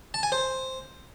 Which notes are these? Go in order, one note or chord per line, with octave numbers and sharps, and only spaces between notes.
A5
G#5
C5